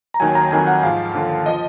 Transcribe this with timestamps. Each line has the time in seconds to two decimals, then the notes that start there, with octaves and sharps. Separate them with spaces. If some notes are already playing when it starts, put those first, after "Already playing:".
0.14 A#5
0.20 D#2 D#3 F#3 G#5
0.35 A#5
0.51 F2 D#3 F#3 G#5
0.67 F#5
0.83 G#2 F3 F5
1.14 D#2 D3 F3
1.46 F3 D#5